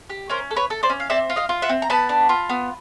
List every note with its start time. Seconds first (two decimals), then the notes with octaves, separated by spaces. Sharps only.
0.10 G4
0.30 C#4 A#4 C5
0.51 A4
0.56 B4 C#5
0.70 A4
0.83 C5 D5
0.90 C#4
1.00 F5
1.10 C4 D5 E5
1.30 F4
1.36 D#5 F5
1.49 F4
1.62 E5 F#5
1.69 C4
1.82 A#5
1.90 B3 A5 B5
2.09 D4
2.29 F4
2.49 B3